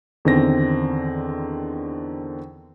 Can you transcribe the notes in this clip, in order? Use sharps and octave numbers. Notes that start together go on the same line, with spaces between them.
E2 D3 D#3 C4 A#6